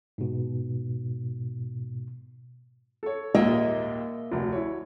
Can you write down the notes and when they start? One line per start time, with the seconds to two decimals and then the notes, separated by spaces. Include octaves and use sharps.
0.18 G#2 B2
3.03 A4 C#5
3.35 A#1 D#2 G#2 A#3 D#5 E5
4.32 F1 D2
4.52 E4 F#4 C#5